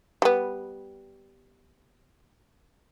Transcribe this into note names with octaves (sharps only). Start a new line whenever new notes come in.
G3 B3